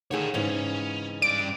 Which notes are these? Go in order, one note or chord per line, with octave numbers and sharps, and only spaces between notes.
D3 D#3 G#4 A4 C#5
G#2 C#3 E3 C#4
G2 D5 D7